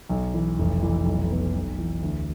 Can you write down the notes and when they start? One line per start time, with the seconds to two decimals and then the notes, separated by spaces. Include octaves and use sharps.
0.09 B1
0.34 E3
0.59 F1
0.83 E3
1.06 B1
1.31 B3
1.54 B1
1.78 E3
2.03 D2